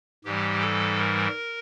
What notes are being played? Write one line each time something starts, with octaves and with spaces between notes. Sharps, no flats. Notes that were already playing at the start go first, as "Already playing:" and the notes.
G#2 E3 G3 G4
A4
A#4